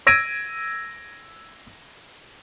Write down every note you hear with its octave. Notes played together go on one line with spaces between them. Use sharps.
E6 G#6 A#6 D7 D#7